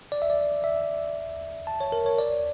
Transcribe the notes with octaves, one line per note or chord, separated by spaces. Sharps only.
D5
E5
D5
E5
A5
C#5
A#4
C#5
D5